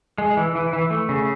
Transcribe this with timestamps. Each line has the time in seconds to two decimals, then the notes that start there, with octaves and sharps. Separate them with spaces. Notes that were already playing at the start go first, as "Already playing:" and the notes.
0.18 G#3
0.37 E3
0.55 E3
0.73 E3
0.90 A3
1.09 C#3